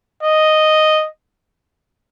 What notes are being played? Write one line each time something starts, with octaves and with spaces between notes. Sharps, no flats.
D#5